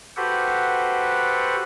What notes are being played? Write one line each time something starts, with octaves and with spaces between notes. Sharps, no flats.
F#4 G4 A4 B4 C5 F#5